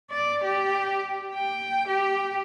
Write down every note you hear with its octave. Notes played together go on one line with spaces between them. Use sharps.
D5
G4
G5
G4